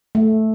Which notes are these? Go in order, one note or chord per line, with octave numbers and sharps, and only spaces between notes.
A3